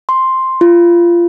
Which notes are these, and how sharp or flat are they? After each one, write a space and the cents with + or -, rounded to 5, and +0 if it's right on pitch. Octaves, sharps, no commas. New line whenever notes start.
C6 +5
F4 -20